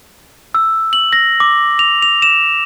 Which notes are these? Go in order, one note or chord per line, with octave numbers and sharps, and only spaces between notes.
E6
F#7
A#6
D6
F7
F7
E7